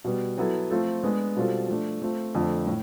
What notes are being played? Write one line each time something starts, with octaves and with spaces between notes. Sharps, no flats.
B2 G3 B3
F#3 B3 E4 A4
F3 A3 C4 F4 A4
G#3 B3 D4
B2 G3 C4 F4 A4
F3 A3 D4
A3 C4 F4
F2 D3 F3 A3
A2